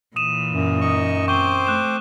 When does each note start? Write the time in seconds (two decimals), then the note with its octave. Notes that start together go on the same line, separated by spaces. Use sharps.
0.16 A#2 E3 D#6 D#7 E7
0.53 F#2
0.81 D#4 D#5 C#6
1.28 C4 C5 C#6 D6 G7
1.67 A3 F#6 E7